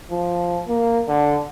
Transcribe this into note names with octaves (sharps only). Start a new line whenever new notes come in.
F3
A#3
D3